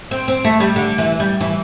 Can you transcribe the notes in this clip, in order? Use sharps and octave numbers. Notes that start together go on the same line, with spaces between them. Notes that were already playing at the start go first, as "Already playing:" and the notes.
C4
C4
A3
G3
D3
E3
G3
E3